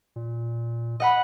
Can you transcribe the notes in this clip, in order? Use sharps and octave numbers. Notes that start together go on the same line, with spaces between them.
A#2
D#5 F#5 B5